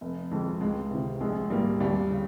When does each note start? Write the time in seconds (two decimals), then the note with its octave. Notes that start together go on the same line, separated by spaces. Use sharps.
0.01 F1
0.31 F2 D#3 G#3
0.61 C#2 G#3
0.91 C3 D#3
1.21 A#1 G#3
1.50 G#2 D#3 G3 A#3
1.80 D#2 G3
2.10 C#3